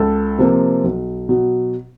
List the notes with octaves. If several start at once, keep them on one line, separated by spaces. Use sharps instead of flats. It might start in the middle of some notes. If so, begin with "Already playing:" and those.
Already playing: C#2 A4
C3 F3 A#3
B1
B2 F#3